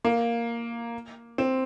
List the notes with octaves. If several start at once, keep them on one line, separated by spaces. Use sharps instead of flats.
A#3
C4